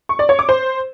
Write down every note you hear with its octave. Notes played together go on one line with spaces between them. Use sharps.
C#6
D5
C#5
D6
C5